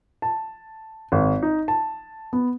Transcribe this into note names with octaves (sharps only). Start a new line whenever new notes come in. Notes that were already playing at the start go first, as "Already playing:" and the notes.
A5
G#1
D#4
A5
B3